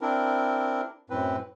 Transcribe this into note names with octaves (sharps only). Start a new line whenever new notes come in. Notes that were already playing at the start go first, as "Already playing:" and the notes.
C4 D4 E4 A#4
F#2 A2 C4 B4